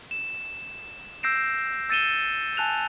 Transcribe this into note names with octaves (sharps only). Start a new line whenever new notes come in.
E7
E6 G6 A#6 C7 D7 E7
E6 A6 C#7 D#7 E7 G7
G#5 A5 F#6 F7